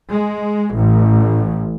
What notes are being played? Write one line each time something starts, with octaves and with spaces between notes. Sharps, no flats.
G#3
A1